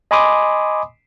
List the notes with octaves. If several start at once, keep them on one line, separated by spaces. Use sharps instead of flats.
D#5 G#5 B5 C6 D6 D#6